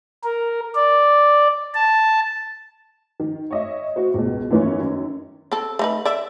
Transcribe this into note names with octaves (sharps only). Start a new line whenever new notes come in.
A#4
D5
A5
D#3
C#5 D#5 E5
E4 F#4 C5
C#2 B2
F#2 D#3 E3 A#3 B3 C#4
F#2 D#3
C4 A4
A3 D#4 B4
D5 E5